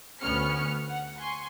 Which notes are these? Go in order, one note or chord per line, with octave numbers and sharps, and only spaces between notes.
D2 B3 C#4 F6 C#7
F#5
G#5 C6 C#6